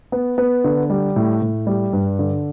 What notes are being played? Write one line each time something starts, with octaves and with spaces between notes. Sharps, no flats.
B3
B3
D3
G3
A2
A2
G3
G2
D3